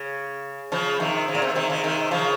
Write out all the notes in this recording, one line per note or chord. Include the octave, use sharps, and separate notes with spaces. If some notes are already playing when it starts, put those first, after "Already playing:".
Already playing: C#3
C#3 F3
C3 D#3
C#3
A#2
C3
C3 D#3
C#3
C3 D#3
C#3 F3